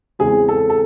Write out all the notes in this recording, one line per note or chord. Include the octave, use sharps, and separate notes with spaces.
E2 C#3 E3 G#3 C4 G#4
A4
A4